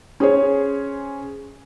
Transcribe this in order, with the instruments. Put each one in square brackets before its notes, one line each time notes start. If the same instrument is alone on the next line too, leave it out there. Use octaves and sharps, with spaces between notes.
[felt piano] C#4 G#4 C5 C#5